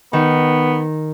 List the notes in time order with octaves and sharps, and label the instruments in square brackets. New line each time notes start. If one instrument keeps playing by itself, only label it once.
[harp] D#3 [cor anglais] B3